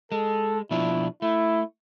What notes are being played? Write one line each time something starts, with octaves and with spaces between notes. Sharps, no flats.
G#3 A4
B2 F3 D4 E4
A3 E4